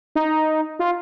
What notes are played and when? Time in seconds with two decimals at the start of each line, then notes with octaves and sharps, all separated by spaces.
0.16 D#4
0.79 F4